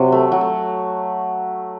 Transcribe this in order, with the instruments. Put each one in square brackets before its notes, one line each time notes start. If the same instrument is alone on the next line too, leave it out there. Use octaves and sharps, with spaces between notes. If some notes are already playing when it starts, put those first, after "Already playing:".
Already playing: [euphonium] C3 [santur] F#3
[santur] A3
F#3
A3